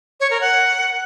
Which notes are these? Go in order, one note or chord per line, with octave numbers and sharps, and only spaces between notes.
C#5
A#4
F#5